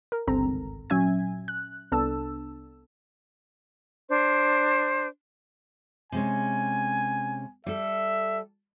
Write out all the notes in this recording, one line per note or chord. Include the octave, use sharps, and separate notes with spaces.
A#4
G1 C#2 C4 A4 A#5
G#1
A#2 F#3 C#4 E5 G#5 G#6
F#6
C2 B3 D4 A4 A5 E6
D4 C5
C3 G#3 C#4 G#5
G3 A4 E5